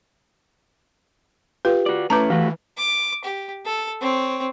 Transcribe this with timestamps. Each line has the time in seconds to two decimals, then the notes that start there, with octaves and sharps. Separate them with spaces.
1.65 F4 G4 B4
1.86 F#4 D5
2.10 A3 C#4 E4 B4 A5 A#5 D6
2.30 E3 A3 F#4 G4 F5
2.78 D6
3.25 G4
3.65 A4
4.01 C4 C#5